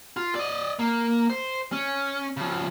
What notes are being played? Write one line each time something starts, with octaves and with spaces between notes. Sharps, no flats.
F4
D5 D#5
A#3
C5
C#4
C#3 F3